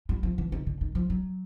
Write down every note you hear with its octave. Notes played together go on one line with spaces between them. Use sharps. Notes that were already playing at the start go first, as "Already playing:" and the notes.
G3
F3
E3
D#3
D3
D#3
F3
F#3